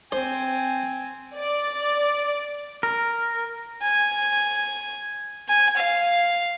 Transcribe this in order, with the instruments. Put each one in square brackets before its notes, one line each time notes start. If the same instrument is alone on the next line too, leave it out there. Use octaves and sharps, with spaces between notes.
[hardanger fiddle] C4 G#5 [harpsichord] C5
[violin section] D5
[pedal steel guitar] A#4
[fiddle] G#5
G#5
F5